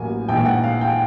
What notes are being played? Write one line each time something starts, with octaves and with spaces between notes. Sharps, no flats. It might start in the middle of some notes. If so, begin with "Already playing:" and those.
Already playing: A1 A2 F#3 A#3 G#5
A#1 G#2 E3 G5
F#5
F5
G5